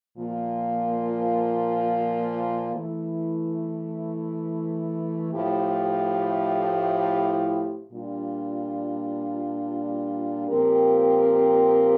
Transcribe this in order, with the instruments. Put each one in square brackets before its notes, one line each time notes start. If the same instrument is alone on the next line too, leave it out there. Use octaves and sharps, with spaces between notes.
[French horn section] A#2 F3 A#3 F4
E3 A3 E4
A2 F3 A3 E4 G4
A#2 G3 D4 F4
A#2 F3 C4 G4 A#4